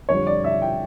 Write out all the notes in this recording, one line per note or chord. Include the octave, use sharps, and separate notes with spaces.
F2 D3 G3 C#5
D5
E5
G5